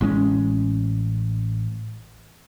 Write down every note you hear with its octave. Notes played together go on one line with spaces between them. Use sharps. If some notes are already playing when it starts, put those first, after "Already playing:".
A1 G#3 C4 C#4